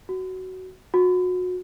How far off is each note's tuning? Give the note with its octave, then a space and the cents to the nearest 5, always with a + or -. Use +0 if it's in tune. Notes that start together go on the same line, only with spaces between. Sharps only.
F#4 +15
F#4 -30